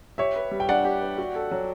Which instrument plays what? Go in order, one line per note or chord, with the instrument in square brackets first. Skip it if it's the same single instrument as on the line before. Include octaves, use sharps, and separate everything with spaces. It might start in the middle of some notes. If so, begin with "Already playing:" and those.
[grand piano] G4 [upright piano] C#5 E5
[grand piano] B4
G3
[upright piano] G5
[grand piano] D4 [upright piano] D5 F#5
[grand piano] G4
B4
F#4
A4
F#3